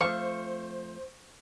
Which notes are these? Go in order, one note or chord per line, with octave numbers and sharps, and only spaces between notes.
F2 F3 A3 C5 F5 C#6